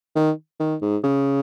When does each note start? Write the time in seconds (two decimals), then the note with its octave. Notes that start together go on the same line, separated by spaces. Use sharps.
0.16 D#3
0.60 D#3
0.82 G#2
1.03 C#3